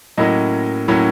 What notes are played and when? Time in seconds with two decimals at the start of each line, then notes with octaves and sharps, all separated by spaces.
0.18 A2 F#3 A#3 C#4 E4 D#5
0.88 A2 F#3 A#3 C#4 E4